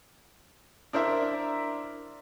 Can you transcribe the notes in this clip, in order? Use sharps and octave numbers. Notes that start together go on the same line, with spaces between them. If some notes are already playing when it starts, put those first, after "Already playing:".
D4 E4 A#4 C5 D5 E5